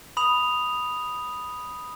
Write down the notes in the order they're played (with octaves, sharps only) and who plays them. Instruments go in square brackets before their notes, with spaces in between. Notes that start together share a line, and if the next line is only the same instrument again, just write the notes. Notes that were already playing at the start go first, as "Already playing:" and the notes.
[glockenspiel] B5 D#6 F7